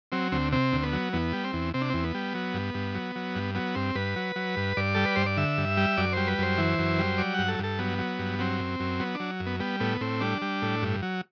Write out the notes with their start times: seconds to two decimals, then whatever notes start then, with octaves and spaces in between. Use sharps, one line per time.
0.12 F#3 C4
0.32 D2 C4
0.52 C3 C4
0.73 D2
0.83 B3
0.93 F#3
1.13 E2 B3
1.33 G3
1.44 C4
1.53 E2
1.74 C3 C4
1.82 D4
1.90 E2 C4
2.04 B3
2.15 G3
2.34 F#3
2.54 G2
2.74 G2
2.94 F#3
3.16 F#3
3.35 G2
3.55 F#3 B3
3.75 G2 C4
3.95 G2 B4
4.16 F#3
4.36 F#3
4.57 G2
4.77 G2 D5
4.95 G3 A4
5.05 B4
5.16 G2 C5
5.26 D5
5.37 D3 E5
5.58 G2
5.77 G3
5.97 F#2 D5
6.13 G3 C5
6.28 B4
6.38 F#2 C5
6.58 E3
6.79 F#2
6.99 G3
7.18 F#3 D5
7.34 G2 F#5
7.48 A4
7.59 G2 A4
7.79 F#3 B3
7.99 F#3
8.19 G2
8.39 F#3 C4
8.60 F#2
8.80 F#2
9.00 F#3 B3
9.15 F#3 D4
9.40 F#2
9.46 B3
9.60 G3 B3
9.80 A2 B3
10.01 A2 C4
10.21 G3 D4
10.42 G3
10.62 A2
10.82 G2
11.02 F#3